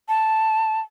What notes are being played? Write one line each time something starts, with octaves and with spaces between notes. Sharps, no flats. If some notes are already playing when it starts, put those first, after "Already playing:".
A5